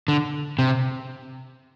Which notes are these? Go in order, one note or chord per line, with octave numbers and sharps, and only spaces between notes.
D3
C3